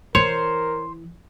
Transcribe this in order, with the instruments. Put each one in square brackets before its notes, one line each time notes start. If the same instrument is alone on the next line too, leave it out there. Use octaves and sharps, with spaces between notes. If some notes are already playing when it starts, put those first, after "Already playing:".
[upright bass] E3 [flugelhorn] A#4 [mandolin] C5 [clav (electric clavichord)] C#5